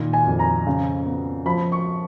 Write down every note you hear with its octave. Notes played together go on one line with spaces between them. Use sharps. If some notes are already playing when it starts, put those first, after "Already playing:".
Already playing: A#2 D#3
G#5
F2
A#5
C#3
B3
F3 B5
C#6